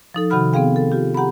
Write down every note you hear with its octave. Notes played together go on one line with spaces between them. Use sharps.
F3 D#4 A4
C3 D#3 F#4 F#5 B5 F6
B3 C4 G#4 F5 G5
A4
F4 G4
G4 F#5 A#5 B5